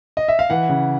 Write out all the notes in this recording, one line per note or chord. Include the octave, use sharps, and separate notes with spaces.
D#5
E5
F5
E3 F#5
C#3